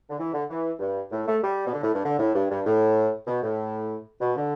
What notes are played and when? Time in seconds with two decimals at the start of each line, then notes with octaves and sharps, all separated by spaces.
0.10 D3
0.18 E3
0.33 D3
0.49 E3
0.79 G2
1.11 A2
1.26 A3
1.42 G3
1.66 B2
1.73 D3
1.83 A2
1.93 G2
2.04 D3
2.19 A2
2.35 G2
2.50 G2
2.66 A2
3.27 B2
3.42 A2
4.20 B2
4.36 D3